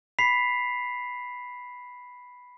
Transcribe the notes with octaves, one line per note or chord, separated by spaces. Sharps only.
B5 B6 C7 F7